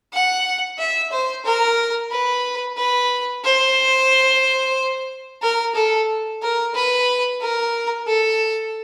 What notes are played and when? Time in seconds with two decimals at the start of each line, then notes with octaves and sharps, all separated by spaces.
0.13 F#5
0.78 E5
1.11 C5
1.45 A#4
2.11 B4
2.77 B4
3.44 C5
5.42 A#4
5.75 A4
6.42 A#4
6.74 B4
7.42 A#4
8.07 A4